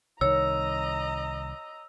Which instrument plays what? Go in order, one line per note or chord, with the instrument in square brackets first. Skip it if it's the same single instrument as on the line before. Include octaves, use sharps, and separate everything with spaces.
[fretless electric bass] C2 D#3 [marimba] C#5 [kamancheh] D#5 A#5 [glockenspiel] E6